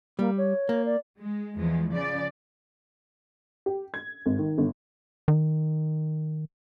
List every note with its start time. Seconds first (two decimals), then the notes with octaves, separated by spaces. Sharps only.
0.19 G3 A#3
0.37 C#5
0.69 A#3
0.85 D5
1.19 G#3
1.56 E2 F3 G#3
1.91 C#3 F3 D5
3.66 G4
3.94 G#6
4.26 G#1
4.39 D#3
4.58 G1
5.28 D#3